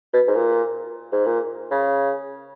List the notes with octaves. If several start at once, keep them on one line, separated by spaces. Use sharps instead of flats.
B2
G#2
A#2
G#2
A#2
C#3